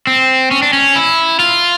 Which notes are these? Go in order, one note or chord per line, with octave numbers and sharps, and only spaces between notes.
C4
C#4
D4
C#4
E4
F4